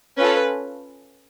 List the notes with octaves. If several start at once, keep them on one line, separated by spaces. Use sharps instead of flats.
C#4 F4 A4 B4